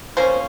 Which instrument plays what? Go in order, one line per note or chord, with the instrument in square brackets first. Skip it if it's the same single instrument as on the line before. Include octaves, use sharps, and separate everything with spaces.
[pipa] F3 A#3 C#4 C5